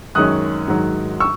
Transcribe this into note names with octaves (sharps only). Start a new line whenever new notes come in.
F#2 D#3 G#3 C#4 D#6 F#6
G#2 D#3 F#3
C#6 E6